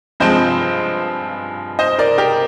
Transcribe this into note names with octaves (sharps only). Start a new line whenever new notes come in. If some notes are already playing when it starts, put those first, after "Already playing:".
G2 F3 G#3 C4 C5 D#5
C5 D#5
A#4 D5
G4 A#4